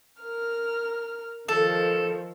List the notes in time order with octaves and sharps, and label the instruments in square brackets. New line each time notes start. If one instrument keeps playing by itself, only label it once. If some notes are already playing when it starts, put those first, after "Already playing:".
[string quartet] A#4 F6
[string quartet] D#3 F3 [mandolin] A4